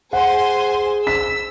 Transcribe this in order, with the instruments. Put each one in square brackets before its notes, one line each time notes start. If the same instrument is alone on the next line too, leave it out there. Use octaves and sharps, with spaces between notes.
[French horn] G#4 [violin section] C5 G#5 C6 [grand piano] F#5
[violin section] E6 [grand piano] B6